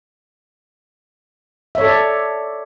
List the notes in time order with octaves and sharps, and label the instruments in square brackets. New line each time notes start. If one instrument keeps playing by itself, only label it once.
[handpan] E5
C#5
A4
D5